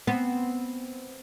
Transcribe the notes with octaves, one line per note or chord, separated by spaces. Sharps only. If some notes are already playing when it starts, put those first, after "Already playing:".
B3 C4